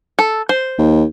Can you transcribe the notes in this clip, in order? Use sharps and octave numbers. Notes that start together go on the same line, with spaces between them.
A4
C5
D#2